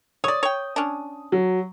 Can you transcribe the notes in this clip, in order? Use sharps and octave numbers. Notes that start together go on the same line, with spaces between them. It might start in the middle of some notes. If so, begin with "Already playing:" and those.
C#5 D5 D#6
C#5 G5
C#4 D4
F#3